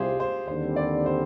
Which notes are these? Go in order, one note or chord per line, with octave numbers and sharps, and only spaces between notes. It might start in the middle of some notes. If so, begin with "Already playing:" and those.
Already playing: C2 C3 G3 F4 G4 G#4 C5
C5
D#2 D3 G3 C4 C5
D5
C5